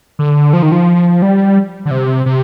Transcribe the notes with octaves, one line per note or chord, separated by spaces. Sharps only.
D3
F3
D#3
F3
G3
D3
C3
C3